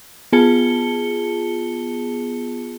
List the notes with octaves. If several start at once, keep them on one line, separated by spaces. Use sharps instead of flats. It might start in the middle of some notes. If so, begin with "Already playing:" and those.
B3 F4 G#4 A5 C#7 G7